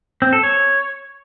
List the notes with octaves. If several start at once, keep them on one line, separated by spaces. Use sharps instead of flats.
C4
A4
C#5